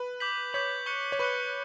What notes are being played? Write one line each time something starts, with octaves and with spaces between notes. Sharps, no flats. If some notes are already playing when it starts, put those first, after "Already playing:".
Already playing: B4
D6 G6 B6 F#7
C#5 D6 G6 B6 F#7
C#6 F#6 C#7 G7
C#5
B4 C#6 F#6 C#7 G7